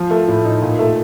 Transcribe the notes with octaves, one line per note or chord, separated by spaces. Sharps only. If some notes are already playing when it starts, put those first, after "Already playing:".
Already playing: F3
A3
A2
D#4
A#2
A3